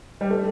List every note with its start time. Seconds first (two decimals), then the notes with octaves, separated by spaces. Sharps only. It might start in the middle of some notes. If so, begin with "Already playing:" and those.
0.21 G3
0.31 A3